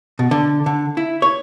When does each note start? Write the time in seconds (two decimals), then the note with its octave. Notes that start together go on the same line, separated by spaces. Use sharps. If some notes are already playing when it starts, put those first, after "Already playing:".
0.19 B2
0.31 D3
0.66 D3
0.97 E4
1.22 C#5